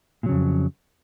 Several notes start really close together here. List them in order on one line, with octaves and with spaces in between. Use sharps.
A#2 F#3 C#3 F2